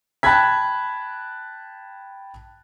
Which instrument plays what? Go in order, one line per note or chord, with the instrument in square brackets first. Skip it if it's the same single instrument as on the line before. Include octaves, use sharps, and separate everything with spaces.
[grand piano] G5 A5 B5 F#6 G#6 B6